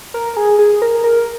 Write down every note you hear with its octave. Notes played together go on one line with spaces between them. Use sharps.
A#4
G#4
G#4
A#4
A#4